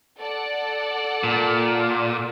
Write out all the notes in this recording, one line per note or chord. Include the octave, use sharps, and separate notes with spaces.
A4 D5 F#5
A#2